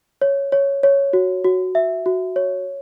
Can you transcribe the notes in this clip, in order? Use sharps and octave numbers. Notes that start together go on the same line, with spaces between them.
C#5
C#5
C#5
F#4
F#4
E5
F#4
C#5